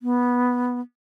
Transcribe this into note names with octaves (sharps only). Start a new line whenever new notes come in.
B3